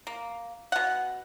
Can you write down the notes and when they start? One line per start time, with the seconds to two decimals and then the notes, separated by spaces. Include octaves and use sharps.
0.07 A#3
0.72 B2 F#5